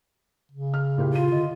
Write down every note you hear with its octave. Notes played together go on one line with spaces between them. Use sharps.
C#3
F6
A#2 E4 G4
F4 F5 D#7
D3 D#5